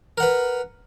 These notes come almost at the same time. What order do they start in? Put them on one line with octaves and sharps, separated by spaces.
A#4 F#5 B4